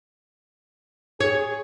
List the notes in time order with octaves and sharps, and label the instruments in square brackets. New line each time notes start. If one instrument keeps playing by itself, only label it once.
[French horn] G#4 [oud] C#5